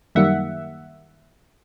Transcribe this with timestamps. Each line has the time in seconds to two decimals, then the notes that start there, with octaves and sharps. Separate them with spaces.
0.15 F#2 D#3 G3 A#3 E5 F#5